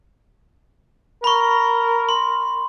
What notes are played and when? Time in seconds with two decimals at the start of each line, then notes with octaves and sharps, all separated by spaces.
1.24 A#4 B5 C#6
2.09 C6